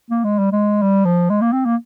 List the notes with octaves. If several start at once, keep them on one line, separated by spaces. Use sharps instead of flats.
A#3
G#3
G3
G#3
G3
F3
G#3
A#3
C4
A#3